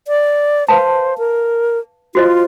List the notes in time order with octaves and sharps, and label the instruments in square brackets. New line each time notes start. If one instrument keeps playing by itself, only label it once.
[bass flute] D5
[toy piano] B4 F5 A5 [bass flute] C5
[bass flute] A#4
[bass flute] F4 [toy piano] F#4 C5 D#5